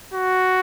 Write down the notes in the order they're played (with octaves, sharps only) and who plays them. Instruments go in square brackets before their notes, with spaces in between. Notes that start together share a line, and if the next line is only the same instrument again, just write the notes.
[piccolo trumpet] F#4